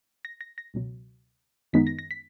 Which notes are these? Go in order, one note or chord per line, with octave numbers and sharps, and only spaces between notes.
A#6
A#6
A#6
C#2 B2 F#3
F#2 D#3 G#3 B3 D#4 B6
A#6
A#6
B6